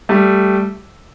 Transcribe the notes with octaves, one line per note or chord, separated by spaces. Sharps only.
G3 A3